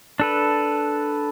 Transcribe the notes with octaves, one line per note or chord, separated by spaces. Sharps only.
D4 A4 B4